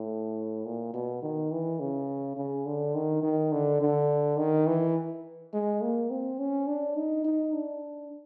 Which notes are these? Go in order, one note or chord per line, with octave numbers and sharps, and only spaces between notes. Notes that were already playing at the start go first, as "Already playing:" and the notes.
Already playing: A2
A#2
B2
D#3
E3
C#3
C#3
D3
D#3
D#3
D3
D3
D#3
E3
G#3
A#3
C4
C#4
D4
D#4
D#4
D4